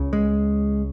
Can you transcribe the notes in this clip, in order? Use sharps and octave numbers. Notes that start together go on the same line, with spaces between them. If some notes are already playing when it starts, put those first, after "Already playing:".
Already playing: C#2 C#3
G#3